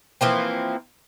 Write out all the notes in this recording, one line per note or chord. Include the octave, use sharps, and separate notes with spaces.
E3 F3 A#3 C4